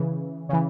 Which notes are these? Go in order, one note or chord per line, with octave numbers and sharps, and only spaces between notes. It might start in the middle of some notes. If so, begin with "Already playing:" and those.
Already playing: C#3 E3
C#3 E3